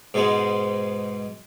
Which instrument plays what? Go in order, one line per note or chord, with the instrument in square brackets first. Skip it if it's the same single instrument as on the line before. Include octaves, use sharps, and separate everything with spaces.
[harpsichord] G#2 B2 G#3